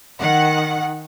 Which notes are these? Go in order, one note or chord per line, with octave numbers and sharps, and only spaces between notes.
D#3 F#5